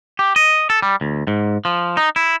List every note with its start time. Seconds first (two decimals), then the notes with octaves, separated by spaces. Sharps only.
0.19 G4
0.36 D#5
0.70 A4
0.82 G3
1.01 D2
1.27 G#2
1.65 F3
1.97 D#4
2.16 E4